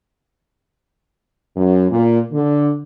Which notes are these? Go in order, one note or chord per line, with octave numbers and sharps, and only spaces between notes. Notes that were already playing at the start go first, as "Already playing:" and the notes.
F#2
A#2
D3